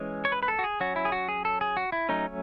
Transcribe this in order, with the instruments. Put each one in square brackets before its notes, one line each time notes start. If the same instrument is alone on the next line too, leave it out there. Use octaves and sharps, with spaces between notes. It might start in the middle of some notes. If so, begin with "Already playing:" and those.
Already playing: [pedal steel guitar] E3 G#3 C#4
C#5
B4
B4
A4
F#4
G#4
F#3 C#4 F#4
E4
G#4
F#4
G#4
A4
G#4
F#4
E4
F#3 A3 C#4 D#4